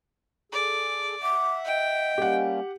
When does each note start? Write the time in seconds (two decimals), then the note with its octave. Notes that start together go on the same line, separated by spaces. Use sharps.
0.52 G#4 A4 D5
1.22 E5 F#5 D6
1.65 D#5 G5
2.18 G3 A#3 C#4 G4 F#5